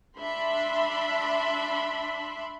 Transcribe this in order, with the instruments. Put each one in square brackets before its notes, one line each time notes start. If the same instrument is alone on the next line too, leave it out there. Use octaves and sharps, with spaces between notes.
[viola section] D4 E5 B5 C6